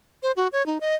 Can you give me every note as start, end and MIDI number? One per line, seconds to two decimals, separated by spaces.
0.23 0.32 72
0.37 0.48 66
0.53 0.65 73
0.66 0.78 63
0.81 0.96 75